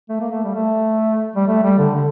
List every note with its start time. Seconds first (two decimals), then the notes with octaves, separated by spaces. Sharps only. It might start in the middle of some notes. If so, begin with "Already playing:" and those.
0.09 A3
0.20 A#3
0.32 A3
0.44 G3
0.55 A3
1.36 G3
1.48 A3
1.63 G3
1.78 D3
1.94 D3